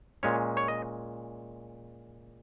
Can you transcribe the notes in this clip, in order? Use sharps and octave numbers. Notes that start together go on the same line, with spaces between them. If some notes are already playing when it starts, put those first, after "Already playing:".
A#2 G#3 C#4 C#5
C#5
D#5